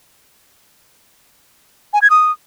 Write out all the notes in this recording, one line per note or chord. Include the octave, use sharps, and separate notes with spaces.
G#5
G#6
D#6